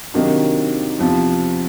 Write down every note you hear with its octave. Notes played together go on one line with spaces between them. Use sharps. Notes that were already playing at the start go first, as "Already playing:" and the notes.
C3 D#3 F#3 A#3 D4
E2 C3 F3